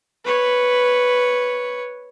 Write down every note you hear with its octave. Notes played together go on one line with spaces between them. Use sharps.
B4 C#5